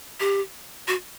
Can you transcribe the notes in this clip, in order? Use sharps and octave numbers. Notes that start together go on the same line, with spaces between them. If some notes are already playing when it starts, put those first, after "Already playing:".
G4
F#4